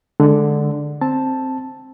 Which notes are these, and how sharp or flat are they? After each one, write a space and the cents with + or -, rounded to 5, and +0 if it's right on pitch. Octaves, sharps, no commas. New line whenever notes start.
D3 +0 G#3 +15
C4 +5 A5 +0